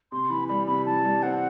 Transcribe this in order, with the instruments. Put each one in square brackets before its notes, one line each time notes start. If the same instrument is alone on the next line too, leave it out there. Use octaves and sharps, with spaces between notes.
[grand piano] C3 [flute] C6
[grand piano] E3 [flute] B5
[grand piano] G3 [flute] B5
[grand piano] C3 [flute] B5
[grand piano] E3 [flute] A5
[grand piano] G3
[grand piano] C4 [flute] F#5